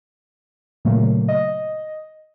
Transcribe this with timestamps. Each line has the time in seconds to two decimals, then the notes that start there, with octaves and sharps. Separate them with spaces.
0.85 A#2 C#3 F#3 A3 A#3
1.28 D#5